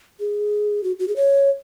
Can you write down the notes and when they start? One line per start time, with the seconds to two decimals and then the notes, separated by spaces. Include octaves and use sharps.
0.20 G#4
0.84 F#4
0.99 F#4
1.08 G#4
1.16 C#5